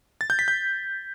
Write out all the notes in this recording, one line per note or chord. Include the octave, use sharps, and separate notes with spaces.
A6
G6
B6
G6